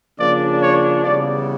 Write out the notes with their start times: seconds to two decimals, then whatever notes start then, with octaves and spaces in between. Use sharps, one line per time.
0.19 C#3 F3 A#3 D4 D5
0.61 C#5
1.03 C#3 E3 G3 B3 D5